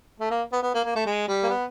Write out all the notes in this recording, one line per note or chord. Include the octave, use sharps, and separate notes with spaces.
A3
A#3
B3
B3
A#3
A#3
A3
G#3
G3
A#3
B3